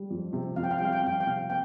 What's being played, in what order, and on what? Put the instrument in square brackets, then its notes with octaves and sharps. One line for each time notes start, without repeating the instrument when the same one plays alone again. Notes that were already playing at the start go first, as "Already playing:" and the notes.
Already playing: [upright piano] G3
F2
C3
[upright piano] F2 [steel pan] F5
[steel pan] G5
F5
[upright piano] G3 [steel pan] G5
[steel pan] F5
G5
F5
[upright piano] F2 [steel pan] G5
[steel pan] F5
G5
[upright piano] C3 [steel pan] F5
[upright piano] A#3 [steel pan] G5